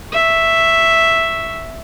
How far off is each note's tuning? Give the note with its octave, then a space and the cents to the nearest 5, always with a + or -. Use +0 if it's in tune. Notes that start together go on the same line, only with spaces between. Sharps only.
E5 +0 C#6 +0